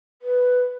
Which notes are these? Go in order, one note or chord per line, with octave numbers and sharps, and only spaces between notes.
B4